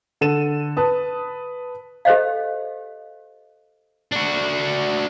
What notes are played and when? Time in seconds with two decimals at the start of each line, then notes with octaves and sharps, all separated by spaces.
0.21 D3 A4 D#7 E7
0.77 B4 A5 D#6
2.05 G4 A4 C5 D#5 F5
4.12 D4 F#4